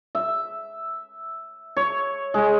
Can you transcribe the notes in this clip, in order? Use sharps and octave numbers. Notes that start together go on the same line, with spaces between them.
E5
C#5
G#3